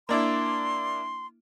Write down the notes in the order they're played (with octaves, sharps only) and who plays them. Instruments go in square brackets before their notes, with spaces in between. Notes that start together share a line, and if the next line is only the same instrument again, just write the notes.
[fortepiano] A#3 D4 E4 [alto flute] C6